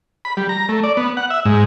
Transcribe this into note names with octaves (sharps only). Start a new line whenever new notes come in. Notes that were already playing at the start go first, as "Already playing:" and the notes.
B5
G3
A#5
A3
D5
B3
F#5
E5
G#2